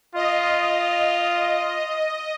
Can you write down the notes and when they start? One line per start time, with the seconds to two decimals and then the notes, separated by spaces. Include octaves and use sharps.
0.15 F4 D#5